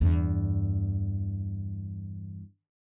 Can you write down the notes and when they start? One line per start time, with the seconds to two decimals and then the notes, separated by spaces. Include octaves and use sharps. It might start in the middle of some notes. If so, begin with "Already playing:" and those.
0.01 E2 G2